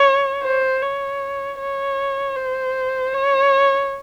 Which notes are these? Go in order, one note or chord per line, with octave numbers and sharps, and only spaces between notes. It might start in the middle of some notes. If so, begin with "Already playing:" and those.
Already playing: C#5
C5
C#5
C#5
C5
C#5